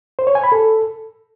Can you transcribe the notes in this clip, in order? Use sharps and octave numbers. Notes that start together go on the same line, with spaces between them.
C5
C#5
G#5
B5
A4